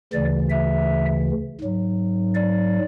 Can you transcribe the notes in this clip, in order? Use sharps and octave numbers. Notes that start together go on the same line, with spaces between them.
D2 C#3 E3 D5
E5
G#2 F#3
D5